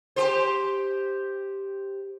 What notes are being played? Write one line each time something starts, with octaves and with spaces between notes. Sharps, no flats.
G4 C5